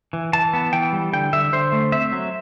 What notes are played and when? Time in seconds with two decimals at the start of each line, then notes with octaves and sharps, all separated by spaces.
0.13 E3
0.33 E3 A5
0.53 B3
0.73 E3 G5
0.93 G3
1.13 D3 G5
1.33 D3 E5
1.52 D3 C5
1.72 A3
1.92 C4 E5
2.12 F#3